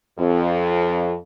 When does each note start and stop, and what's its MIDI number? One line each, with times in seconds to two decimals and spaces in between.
0.19 1.15 41